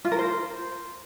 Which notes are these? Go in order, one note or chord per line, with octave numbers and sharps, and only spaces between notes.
F4
A#4
C5